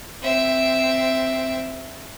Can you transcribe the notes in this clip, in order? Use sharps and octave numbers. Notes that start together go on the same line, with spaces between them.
C4 E5